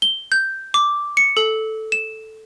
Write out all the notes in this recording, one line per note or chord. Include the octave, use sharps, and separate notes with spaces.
G7
G6
D6
C#7
A4
E7